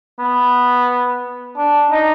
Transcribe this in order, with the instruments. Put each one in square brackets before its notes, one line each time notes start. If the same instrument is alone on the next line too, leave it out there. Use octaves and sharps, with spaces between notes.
[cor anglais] B3
D4
D#4